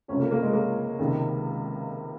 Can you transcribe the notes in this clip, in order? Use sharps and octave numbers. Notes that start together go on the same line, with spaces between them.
C#2 C3 F3 C#4
A#3
A#3
G#3
A#3
C#2 C3 D#3